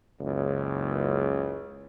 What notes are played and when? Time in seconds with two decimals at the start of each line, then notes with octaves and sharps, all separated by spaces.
0.20 F#1 C#2